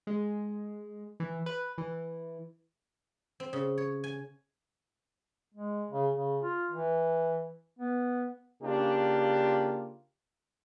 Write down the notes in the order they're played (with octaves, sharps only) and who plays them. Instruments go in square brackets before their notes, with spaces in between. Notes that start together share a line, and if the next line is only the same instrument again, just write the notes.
[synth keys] G#3
E3
B4
E3
[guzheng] C4
C#3
C#5
G#5
[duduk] G#3
C#3
C#3
F4
E3
B3
[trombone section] C#3 A#3 D4 F4 G4